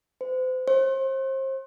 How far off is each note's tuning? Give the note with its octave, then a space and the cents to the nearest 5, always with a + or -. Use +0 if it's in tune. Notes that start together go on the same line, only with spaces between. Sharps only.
C5 -35
C5 +30